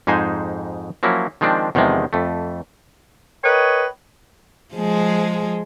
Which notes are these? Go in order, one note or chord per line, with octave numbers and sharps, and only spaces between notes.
F2 G#2 G#3 D#4 C5 G#5
F3 F#3 A#3 C#4 E4
D#3 F3 G#3 C4 D4
E2 C3 D#3 F3 G#3
F2 A3
A#4 B4 C#5 D#5 G5
F3 G#3 G#4